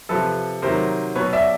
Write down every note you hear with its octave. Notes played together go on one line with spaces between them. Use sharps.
C3 F3 A4 B4
C3 D#3 F#3 A#4 C5
B2 F#3 B4 C#5
D5 E5